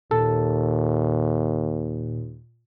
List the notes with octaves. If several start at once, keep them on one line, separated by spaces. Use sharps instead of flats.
D#2 A#2 A4